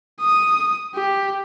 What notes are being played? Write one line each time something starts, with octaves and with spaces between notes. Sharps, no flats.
D#6
G4